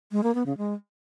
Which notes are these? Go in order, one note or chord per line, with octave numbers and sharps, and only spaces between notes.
G#3
A#3
B3
C#3
G#3